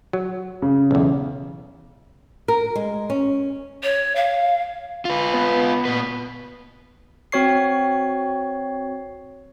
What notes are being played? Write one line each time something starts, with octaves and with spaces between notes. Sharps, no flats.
F#3
C#3
B1 E2
A#4
G#3
C#4
C#5
F5
F4 B4
B3
A#2 B4
C4 F#4 C#5 C#6 C7